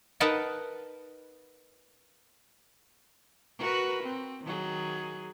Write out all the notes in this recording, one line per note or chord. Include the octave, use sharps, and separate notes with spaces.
D#4 A#4 B4 D#5 F#5 A5
F#4 A#4 B4
C4
D#3 F#3 G#4